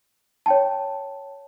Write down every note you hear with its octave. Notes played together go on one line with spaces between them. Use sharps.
C#5 G5 A5